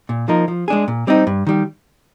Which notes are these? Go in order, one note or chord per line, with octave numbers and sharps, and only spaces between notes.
A#2
F3 A#3 D#4 A#4
F3
G#3 D4 G#4
A#2
G3 C4 D#4
G2
D#3 G3